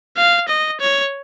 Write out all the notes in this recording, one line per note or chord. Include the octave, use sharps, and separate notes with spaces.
F5
D#5
C#5